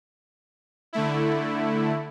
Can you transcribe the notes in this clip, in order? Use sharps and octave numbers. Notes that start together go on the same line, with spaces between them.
D3 A3 E4